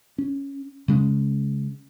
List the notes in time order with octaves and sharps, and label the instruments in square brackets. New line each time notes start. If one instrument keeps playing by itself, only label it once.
[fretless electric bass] C#4
C#3 G#3 C#4